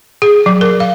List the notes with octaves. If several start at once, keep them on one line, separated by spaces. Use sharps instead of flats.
G#4
F#3
A#4
F5